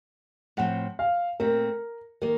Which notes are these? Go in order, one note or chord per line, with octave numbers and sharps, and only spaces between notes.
A2 F3 C4 F#5
F5
A#2 A3 C4 A#4
D#3 A#3 A#4